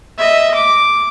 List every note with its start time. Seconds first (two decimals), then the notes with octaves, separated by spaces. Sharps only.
0.18 D#5 E5
0.54 D6